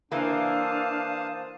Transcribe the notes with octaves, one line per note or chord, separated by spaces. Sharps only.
E3 A#3 D4 C5 F5 A5 D#6